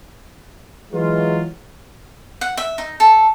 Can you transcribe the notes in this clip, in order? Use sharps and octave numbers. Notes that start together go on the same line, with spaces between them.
E3 F#3 G#3 F4
F#5
E5
D#4
A4